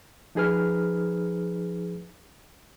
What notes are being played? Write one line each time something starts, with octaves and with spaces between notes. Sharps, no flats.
F3 D#4 G#4 B4 F6